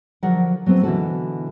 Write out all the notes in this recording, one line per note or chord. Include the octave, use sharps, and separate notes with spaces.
D3 F3 F#3 F#4 A#4 F#5
F#3 A3 B3 C4
B2 D3 E3 E4 F#4 A4